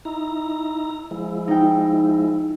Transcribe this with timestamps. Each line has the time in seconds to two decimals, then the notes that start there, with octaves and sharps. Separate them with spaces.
0.05 D#4 E4 A#5
1.11 F3 G#3 E4
1.48 D#4 G5